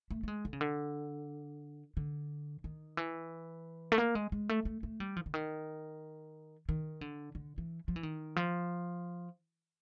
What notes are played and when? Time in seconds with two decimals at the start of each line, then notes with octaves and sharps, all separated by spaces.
0.11 A3
0.23 A3
0.28 G#3
0.45 D3
0.53 C#3
0.61 D3
1.97 D3
2.64 D#3
2.97 E3
3.92 A3
3.98 A#3
4.15 G#3
4.32 G#3
4.49 A3
4.65 A3
4.83 A3
5.00 G3
5.16 F3
5.26 D3
5.34 D#3
6.69 D#3
7.01 D3
7.35 D3
7.58 E3
7.88 F3
7.96 E3
8.03 D#3
8.36 F3